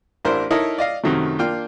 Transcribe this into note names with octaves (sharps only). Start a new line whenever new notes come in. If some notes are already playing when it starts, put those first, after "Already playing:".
A1 D4 E4 A#4 C5
D#4 E4 A4 A#4 C#5 D#5
D5 D#5 F5
F#2 C3 D#3 F#3 A3
A#3 D4 F4 G5 F6